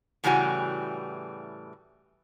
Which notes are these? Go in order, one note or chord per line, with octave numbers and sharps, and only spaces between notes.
A2 C#3 E3 G3 F#4 G#5